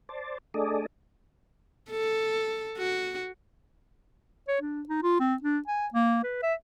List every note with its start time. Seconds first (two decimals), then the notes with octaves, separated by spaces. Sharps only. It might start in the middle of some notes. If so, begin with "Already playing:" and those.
0.09 C5 D5 A5
0.54 A3 D4 G#4 A4 D5 D#5
1.91 A4
2.78 F#4
4.48 C#5
4.62 D4
4.89 D#4
5.03 F4
5.20 C4
5.42 D4
5.67 G#5
5.93 A#3
6.24 B4
6.43 E5